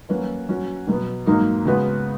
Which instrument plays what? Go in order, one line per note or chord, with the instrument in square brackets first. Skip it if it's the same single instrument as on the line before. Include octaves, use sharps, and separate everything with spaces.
[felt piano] F#3 A#3 C#4 F#4 B4
F#3 C#4 F#4
B2 F#3 B3
G#2 F#3 A#3 D#4
C#3 G#3 B3 F#4 B4